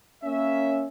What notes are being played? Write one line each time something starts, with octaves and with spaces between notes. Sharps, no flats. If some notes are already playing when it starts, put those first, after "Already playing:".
A#3 C#4 E5